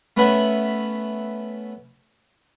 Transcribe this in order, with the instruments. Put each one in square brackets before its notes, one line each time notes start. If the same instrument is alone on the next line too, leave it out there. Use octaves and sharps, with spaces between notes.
[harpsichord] A3 B3 C#4 B4 E5 F#5